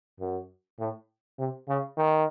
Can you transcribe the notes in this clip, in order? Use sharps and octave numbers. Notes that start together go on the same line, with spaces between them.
F#2
A2
C3
C#3
D#3